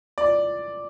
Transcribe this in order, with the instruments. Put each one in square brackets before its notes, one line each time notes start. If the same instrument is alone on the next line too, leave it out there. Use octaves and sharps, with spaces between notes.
[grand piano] D5